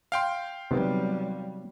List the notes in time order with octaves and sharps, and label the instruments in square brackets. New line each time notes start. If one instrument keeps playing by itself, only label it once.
[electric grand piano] F5 G5 C6
[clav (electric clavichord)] C3 D#3 B3 [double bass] F#3 G3